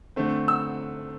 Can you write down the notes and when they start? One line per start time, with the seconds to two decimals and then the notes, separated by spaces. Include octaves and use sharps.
0.16 D3 A3 C4
0.48 E6